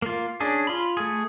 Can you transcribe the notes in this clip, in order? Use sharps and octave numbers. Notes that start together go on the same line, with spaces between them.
A#3 F4
C#4 D4 G#4
F4 B5
A3 G#4